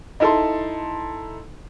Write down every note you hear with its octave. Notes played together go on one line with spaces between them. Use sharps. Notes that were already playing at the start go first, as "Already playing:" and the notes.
D#4 E4 A4 A5 C6